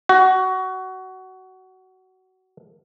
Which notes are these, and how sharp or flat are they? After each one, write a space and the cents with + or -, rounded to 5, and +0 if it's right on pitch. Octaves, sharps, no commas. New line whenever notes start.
F#4 +20